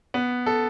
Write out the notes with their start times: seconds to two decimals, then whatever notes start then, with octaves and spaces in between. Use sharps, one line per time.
0.14 B3
0.46 A4